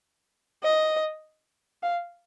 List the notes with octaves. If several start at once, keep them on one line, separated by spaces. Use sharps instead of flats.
D#5
F5